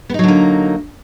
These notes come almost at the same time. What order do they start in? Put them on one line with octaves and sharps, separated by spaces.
B3 D#4 F#3 D3 A#3